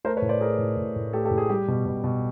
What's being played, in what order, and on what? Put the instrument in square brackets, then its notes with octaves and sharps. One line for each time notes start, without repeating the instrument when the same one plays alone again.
[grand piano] A3 A#4 C5
B4 C#5
A2
C5 D5
A3 G#4 A#4
A2
A2
A2
A3 G4 A4
G4 A4
A2
G#4
G3 G4
B2
B2
B2